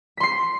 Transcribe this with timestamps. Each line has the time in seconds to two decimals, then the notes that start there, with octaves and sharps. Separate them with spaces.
0.17 B6
0.20 C6
0.23 C7